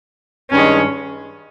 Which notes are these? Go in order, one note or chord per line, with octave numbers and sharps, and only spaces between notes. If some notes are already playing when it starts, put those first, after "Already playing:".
G2 D#3 G#3 C#4